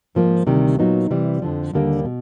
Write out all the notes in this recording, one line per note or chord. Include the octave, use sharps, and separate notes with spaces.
G#2 F3 A#3
D2 C3 D#3 G3
A#2 F#3 B3 D#4
C3 E3 G3
F2 D3 F3
D#2 D3 G3 A#3
B2